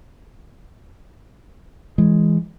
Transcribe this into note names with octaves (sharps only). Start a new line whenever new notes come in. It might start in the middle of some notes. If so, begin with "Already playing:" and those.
E3 G#3